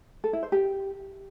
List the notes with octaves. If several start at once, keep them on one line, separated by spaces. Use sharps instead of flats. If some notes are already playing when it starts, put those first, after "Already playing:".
A4
E4
C5
G4